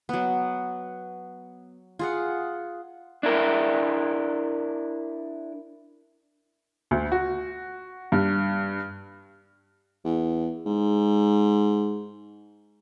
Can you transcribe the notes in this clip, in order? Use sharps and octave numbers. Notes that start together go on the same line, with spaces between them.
F#3 B3
F4 G#4 F#5
D4 E4 A#4
D2
F#4
G2
E2
G#2